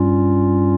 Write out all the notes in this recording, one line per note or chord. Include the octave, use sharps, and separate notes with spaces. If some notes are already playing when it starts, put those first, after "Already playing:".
Already playing: G2 G3 C#4 F4